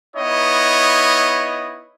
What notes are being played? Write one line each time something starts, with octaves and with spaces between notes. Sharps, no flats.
B3 D#4 E4 C#5 D#5